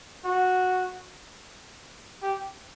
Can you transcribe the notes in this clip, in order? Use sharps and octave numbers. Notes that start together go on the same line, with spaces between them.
F#4
G4